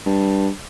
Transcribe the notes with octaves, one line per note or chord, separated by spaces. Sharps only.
G2